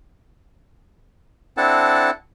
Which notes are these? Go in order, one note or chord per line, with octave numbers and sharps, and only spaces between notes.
C4 D4 E4 A4 F#5 A5